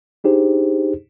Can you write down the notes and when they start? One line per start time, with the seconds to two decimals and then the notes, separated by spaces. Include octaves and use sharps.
0.24 D4 D#4 G4 G#4 C5